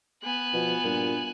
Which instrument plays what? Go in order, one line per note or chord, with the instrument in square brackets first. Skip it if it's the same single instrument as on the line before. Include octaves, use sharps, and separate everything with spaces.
[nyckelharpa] B3 [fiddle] G#5 F#6
[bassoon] B2 [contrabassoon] F3
[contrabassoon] G2 [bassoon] A#2